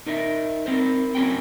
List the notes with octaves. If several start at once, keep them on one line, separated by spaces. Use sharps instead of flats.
D#4 A#4 D#5 E5
C4 A#4 C5
C#4 F#4 A#4 F#5 G5